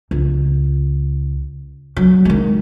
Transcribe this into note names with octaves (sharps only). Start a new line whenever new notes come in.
C#2
F#3
D#3 G#3